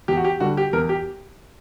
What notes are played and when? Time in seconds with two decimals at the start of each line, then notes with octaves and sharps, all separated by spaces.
0.08 E2 G4
0.17 F#4
0.24 G4
0.40 D3 G3 F#4
0.57 G4
0.73 E2 A#4
0.89 G4